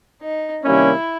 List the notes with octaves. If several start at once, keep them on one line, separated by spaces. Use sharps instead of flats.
D#4
C3 D#3 G3 A#3 C#4 E4